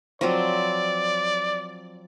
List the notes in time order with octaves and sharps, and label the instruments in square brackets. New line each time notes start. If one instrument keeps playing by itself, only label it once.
[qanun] F3 F#3 C4 [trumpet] D5